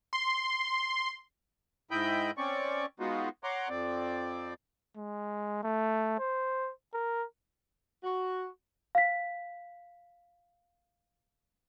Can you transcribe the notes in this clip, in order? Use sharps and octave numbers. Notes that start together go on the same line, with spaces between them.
C6
G#2 E4 D#5 G5 B5 G6
C4 C#4 D5 C#6
G#3 B3 D#4 F4 F#4
C#5 F#5 A#5 C6 D6
F2 C4 D5
G#3
A3
C5
A#4
F#4
F5 B6